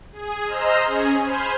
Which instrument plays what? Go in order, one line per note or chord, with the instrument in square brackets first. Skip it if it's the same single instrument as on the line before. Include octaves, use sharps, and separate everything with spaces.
[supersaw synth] G#4
C5 D#5 A#5 C6 E6 F6
C#4 G#4
C5 G#5 B5 C6 F6